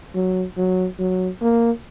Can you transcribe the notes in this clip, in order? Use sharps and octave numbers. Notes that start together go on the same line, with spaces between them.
F#3
F#3
F#3
A#3